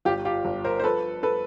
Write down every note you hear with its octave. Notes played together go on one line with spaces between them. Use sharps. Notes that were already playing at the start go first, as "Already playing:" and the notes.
G1 F4 G4
F4 G4
G1
A#4 C5
C5
F3 A4 B4
A4 B4